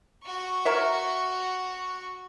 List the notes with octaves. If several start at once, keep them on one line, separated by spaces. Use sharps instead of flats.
F#4 C#6
A#4 C#5 E5